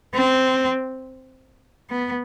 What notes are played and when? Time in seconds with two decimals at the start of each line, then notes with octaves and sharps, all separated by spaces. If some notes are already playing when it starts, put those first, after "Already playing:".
0.15 C4
1.90 B3